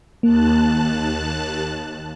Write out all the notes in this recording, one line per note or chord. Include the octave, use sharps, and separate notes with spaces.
D#2 A#3 A5 F#6